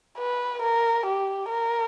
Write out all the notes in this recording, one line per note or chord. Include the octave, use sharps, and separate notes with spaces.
B4
A#4
G4
A#4